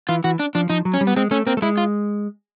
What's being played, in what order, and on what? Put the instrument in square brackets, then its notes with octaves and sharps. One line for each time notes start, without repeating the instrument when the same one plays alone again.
[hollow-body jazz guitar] E3 [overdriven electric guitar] F4
[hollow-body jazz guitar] E3 [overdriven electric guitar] F#4
[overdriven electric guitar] D4
[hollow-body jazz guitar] F3 [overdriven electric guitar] D4
[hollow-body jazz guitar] F3 [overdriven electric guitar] D#4
[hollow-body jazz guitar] F#3
[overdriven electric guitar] C#4
[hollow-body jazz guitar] G3
[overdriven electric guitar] B3
[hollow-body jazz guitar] G#3 [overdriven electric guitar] C4
[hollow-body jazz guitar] A3 [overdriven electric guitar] C#4
[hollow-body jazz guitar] A#3 [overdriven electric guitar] C4
[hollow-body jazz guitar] A3
[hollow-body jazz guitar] G#3 [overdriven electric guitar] E4
[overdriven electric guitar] F4